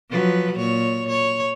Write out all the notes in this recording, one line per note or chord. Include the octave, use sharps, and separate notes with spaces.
F3 F#3 B4
A#2 C#5
C#5